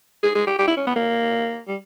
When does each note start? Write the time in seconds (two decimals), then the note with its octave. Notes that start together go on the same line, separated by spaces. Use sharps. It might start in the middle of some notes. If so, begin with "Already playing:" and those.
0.23 G#4
0.35 G#4
0.47 G4
0.59 G4
0.68 E4
0.77 C#4
0.87 B3
0.96 A#3
1.68 G3